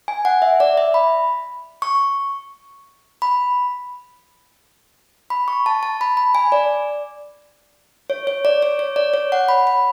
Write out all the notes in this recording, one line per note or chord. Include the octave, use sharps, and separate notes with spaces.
G#5
F#5
E5
D5
E5
B5
C#6
B5
B5
C#6
A5
A5
B5
B5
G#5
D5
C#5
C#5
D5
C#5
C#5
D5
C#5
F#5
B5
B5